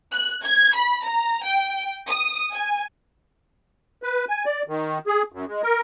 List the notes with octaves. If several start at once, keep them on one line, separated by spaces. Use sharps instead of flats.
F#6
G#6
B5
A#5
G5
D#6
G#5
B4
G#5
D5
D#3
G#4
F#2
G#3
A#4